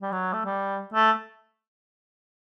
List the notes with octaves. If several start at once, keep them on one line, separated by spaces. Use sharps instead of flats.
G3
F#3
A3
G3
A3